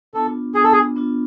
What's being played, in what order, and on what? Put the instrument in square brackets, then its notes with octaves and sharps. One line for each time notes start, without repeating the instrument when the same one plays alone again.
[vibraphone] B3 D4 F4 [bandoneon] A4
[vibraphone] B3 D4 F4 [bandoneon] G#4
[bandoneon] A4
G#4
[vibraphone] B3 D4 F4